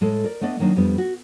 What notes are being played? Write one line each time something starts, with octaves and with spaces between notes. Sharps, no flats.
A2 G#3 A4
A#4 D5
A3 B3 D4 D5 D#5
D#3 F#3 A#3 D4 D#4
F2 G3 B3 D4
F#4